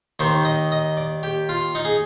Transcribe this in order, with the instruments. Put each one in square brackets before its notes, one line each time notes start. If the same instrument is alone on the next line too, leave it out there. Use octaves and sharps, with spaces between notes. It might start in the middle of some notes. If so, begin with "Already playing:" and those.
[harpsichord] D#2 D#3 C5
D#5
D#5
D5
G4
F4
D#4
G#4